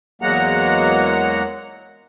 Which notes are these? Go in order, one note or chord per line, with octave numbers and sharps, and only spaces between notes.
E2 F#3 G#3 A#3 F#5 A#5